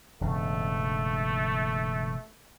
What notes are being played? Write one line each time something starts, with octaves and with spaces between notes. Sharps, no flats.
E1 G2 C#3 A3